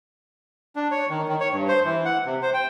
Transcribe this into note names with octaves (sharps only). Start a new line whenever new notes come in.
D4
C#5
D#3
D#3
C#5
G2
C5
E3
F#5
C3
C5
G5